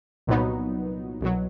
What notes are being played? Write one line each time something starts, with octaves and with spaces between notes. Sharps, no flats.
C2 A#2 F#3 B3 D#4
C2 B2 F#3